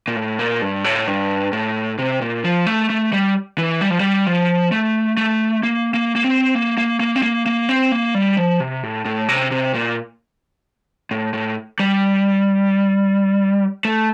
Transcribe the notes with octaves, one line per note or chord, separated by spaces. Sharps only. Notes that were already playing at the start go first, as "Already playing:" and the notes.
A#2
A2
A#2
G2
A2
G2
A2
C3
A#2
F3
A3
A3
G3
E3
G3
F3
G3
F3
A3
A3
A#3
A#3
A#3
C4
A#3
A#3
A#3
C4
A#3
A#3
C4
A#3
G3
F3
C3
A2
A2
C3
C3
A#2
A2
A2
G3
A3